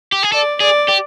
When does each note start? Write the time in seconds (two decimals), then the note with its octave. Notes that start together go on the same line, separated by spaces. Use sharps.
0.12 G4
0.23 G#4
0.32 A4 D5
0.60 G#4 D5
0.88 G4